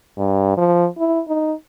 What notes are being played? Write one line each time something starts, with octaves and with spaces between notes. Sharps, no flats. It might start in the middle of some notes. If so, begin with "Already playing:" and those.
G2
F3
E4
D#4